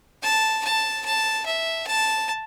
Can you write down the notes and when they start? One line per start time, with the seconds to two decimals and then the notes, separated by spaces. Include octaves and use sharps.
0.23 A5
0.65 A5
1.05 A5
1.46 E5
1.87 A5